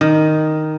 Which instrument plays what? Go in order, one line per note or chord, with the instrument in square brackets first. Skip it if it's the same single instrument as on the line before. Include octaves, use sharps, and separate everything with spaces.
[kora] D#3